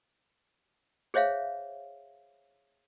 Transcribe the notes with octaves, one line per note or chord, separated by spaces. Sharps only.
G#4 C5 C#5 E5 F5